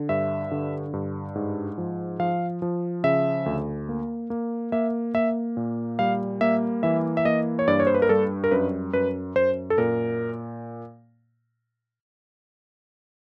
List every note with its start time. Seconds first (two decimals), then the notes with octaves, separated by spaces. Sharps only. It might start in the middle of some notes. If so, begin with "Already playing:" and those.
Already playing: D3
0.09 G2 E5
0.51 D3
0.93 G2
1.35 G#2
1.78 F3
2.20 F3 F5
2.62 F3
3.04 C#3 E5
3.46 D2
3.89 A#3
4.30 A#3
4.72 A#3 E5
5.14 A#3 E5
5.57 A#2
5.99 G3 F5
6.41 A#3 E5
6.83 E3 E5
7.17 E5
7.25 A#3 D#5
7.59 C#5
7.67 G2 D5
7.80 C#5
7.87 C5
7.94 B4
8.02 A#4
8.09 G3 A4
8.44 A#4
8.51 F#2 B4
8.93 F#2 B4
9.35 F#2 C5
9.70 A4
9.78 A#2 A#4